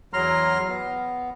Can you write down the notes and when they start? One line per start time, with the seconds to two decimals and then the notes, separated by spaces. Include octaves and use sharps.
0.13 E2 F#3 A#5 C6 F6
0.68 B3